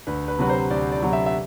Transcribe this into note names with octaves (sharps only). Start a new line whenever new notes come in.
D2 B4
B4
C3 F#3 B4
C5
D2 D5
D5
C3 F#3
E5
E5